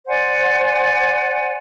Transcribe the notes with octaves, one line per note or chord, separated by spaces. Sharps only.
C5 D5 F#5 G#5